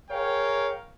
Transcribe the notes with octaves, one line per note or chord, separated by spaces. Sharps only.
G#4 A#4 C#5 F5 G5